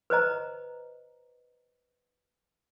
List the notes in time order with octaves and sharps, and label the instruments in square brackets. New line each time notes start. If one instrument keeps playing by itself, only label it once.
[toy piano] B4 C5 D#5 A#5